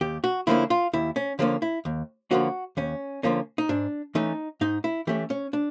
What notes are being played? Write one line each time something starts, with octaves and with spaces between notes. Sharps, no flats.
D#2 G4
F#4
D3 F3 A#3 C#4 E4
F4
D#2 E4
C#4
D3 F3 A#3 C#4 D4
E4
D#2
D3 F3 A#3 C#4 F#4
D#2 C#4
D3 F3 A#3 C#4
D#4
G#2 D4
E3 A3 C#4 D#4
G#2 D#4
E4
E3 A3 C#4 G4
C#4
D4